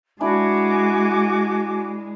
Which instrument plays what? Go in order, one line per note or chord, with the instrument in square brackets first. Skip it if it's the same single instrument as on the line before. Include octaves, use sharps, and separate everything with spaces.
[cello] G#3 [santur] D4 E4 [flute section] F#4 G#5 D6